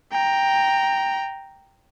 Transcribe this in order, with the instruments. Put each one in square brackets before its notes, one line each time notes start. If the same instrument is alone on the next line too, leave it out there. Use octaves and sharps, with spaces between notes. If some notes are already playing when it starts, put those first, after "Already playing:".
[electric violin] G5 A#5